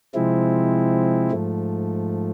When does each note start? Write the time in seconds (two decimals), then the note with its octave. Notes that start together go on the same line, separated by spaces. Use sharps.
0.14 C3 F3 G#3 C4 E4
1.32 G#2 F3 A3